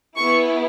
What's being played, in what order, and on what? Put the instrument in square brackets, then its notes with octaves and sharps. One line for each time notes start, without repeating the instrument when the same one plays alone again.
[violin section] B3 E4 G#4 C#6